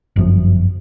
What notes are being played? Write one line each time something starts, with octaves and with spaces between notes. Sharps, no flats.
G1 F#2 F3